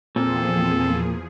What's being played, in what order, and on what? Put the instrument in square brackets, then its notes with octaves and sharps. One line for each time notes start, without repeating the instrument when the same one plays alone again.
[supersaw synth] E2 F3 G#4 [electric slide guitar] A#2 [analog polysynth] C4 [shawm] A4